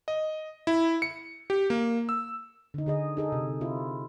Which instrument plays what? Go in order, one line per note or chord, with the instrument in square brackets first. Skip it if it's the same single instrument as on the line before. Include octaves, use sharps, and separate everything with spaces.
[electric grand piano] D#5
E4
C#7
G4
A#3
E6
[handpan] D3 D#4
D3 G#4 D#5
D#4 G#4 A4
C3
C4 E4 F4